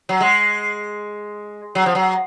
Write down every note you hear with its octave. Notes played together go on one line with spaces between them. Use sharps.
F#3
G#3
F#3
F3
F#3